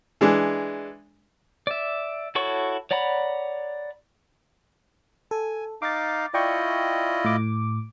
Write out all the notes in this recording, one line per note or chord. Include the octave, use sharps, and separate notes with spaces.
E3 G#3 D4
D5 E5
E4 F#4 A4 C#5 C#6
C#5 D5 F#5 A#5 B5
A4 G#5
D#4 F5 D6 A6
E4 F4 D5 D#5 G5 C#6
A2 D6